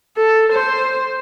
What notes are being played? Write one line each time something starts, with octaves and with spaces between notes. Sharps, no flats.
A4
C5